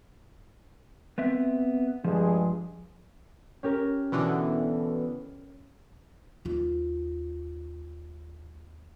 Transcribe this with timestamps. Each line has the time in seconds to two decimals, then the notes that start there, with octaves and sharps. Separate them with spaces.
1.18 B3 C4 E5
2.04 G2 F3 G#3 G#4
3.63 C#4 G4 A#4
4.12 B2 D3 E3
6.45 D#2 F4